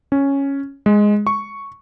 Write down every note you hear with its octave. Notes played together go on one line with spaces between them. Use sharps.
C#4
G#3
C#6